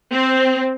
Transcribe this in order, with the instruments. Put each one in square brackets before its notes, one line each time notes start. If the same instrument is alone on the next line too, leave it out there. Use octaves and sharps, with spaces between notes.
[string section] C4